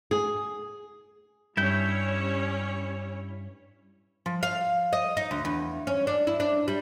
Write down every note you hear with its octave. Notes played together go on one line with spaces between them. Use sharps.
G#4
G2 G3 C#4 E4 C#5 G6
F3
F5
D#5
D#4
D2
E2
C#4
D4
E4
D4
G3